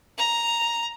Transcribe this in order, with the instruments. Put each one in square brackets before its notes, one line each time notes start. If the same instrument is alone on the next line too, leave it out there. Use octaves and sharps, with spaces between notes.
[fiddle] A#5